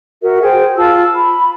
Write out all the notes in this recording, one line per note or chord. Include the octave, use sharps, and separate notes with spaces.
F#4 A#4 E5
G#4 C5 G5
F4 A5 E6
B5